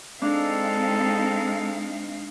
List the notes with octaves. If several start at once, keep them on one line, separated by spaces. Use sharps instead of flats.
G#3 C4 D4 D#4 A4 F5